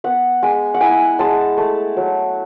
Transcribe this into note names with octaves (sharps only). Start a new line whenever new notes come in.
B3 F#5
G#3 G#5
F#5
E4 G#5
G#3 A5
A3
F#3